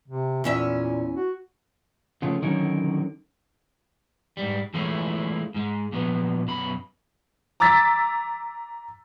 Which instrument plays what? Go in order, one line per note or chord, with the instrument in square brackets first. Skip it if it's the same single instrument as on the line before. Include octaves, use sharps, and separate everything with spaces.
[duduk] C3
[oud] E2 C#4 E5 [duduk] A#2
[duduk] F#4
[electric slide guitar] C#3 F3 A3 F4
D3 D#3 F#3 C#4 D#4 A#4
[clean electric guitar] G#2 G3
E3 G#3 A3 C#4 E4 F4
G#2 G#3
A#2 F3 B3
F#2 B2 B5
[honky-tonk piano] A#5 D6 E6 A6 B6